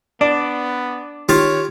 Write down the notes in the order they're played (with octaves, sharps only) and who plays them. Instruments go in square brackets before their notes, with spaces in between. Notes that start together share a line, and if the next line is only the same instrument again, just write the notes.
[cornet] B3 [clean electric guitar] D4 [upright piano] D5
[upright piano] D#3 [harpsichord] F4 G4 [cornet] C#5